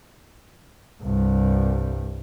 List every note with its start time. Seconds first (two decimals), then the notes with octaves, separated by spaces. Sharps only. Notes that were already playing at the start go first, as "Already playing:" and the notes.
1.03 C2 G2